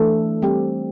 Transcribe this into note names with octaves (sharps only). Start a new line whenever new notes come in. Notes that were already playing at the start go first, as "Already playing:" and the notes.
Already playing: E3 A3 D4 A4
G3 C4 G4